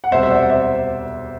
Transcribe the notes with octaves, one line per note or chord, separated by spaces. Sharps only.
F#5
E1 D2 C3 G3 C5 E5
E5
D5 F#5
C5 E5